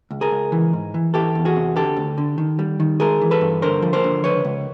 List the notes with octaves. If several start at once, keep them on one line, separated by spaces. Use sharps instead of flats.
C#2
G#4 A#4
C#2
E3
G#2
E3
E3 G4 A4
E2
F#4 G#4
C3
D3 G4 A4
D2
D3
D#3
G3
D#3
G#3 G#4 A#4
E3
A4 B4
G2
D3 A#4 C5
F3
A#4 C5
D3
C#2 B4 C#5
C#2